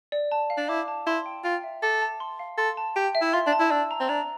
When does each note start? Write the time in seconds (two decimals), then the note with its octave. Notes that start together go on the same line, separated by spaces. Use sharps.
0.12 D5
0.32 A5
0.50 F5
0.57 D4
0.69 E4 D6
0.88 A5
1.07 E4 C6
1.26 G5
1.45 F4 G5
1.63 E5
1.82 A4 D6
2.02 A5
2.20 C6
2.39 F5
2.58 A4 C6
2.77 A5
2.96 G4 G5
3.15 E5
3.21 E4
3.34 F4 C6
3.47 D4
3.52 A5
3.60 E4
3.71 D4 E6
3.91 A#5
4.01 C4
4.09 D4 A#5